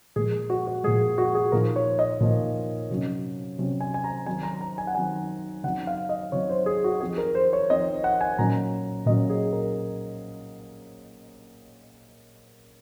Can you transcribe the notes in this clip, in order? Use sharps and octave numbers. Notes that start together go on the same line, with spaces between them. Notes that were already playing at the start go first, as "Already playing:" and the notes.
A#2 F3 G#3 G#4
F#4
F#4
A#2 F3 G#3 G#4
F#4
G#4
A#2 F3 A#3 D#4 A#4
C#5
D#5
A#2 F3 A#3 D#4
C3 F#3 C#4
C3 F#3 C#4
G#5
G#5
A#5
D#3 F#3 C4 D#4 G#5
A#5
A#5
G#5
F#5
D#3 F#3 C4 D#4 G#5
C#3 F#3 C4 D#4 F#5
F5
D#5
C#3 F#3 C4 D#4 C#5
C5
G#4
F#4
F3 C4 D#4 G#4
A#4
C5
C#5
F3 C4 D#4 D#5
F#5
G#5
A#2 F#3 C#4 A#5
A#2 F#3 C#4 D#5
G#4
A#4